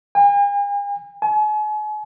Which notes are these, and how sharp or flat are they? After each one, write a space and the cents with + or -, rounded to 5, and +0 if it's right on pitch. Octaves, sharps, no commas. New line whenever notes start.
G#5 -45
G#5 +40